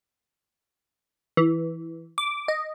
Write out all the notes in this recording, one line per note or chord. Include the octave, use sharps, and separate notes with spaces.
E3
D6
D#5